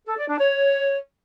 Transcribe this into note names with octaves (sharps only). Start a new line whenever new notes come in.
A4
D5
D4
C#5